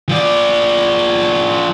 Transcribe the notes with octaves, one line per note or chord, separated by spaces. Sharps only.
F3 D5